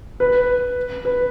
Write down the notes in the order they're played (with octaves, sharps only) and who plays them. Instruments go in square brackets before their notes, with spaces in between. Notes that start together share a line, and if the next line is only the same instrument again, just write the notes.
[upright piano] B4
B4